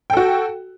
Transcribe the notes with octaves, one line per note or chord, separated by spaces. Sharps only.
F#4 A4 G5